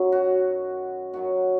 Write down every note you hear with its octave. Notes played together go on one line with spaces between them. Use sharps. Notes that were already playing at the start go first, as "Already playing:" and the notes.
Already playing: F#2 D#3 F#3
F#4
F#2 D#3 F#3 F#4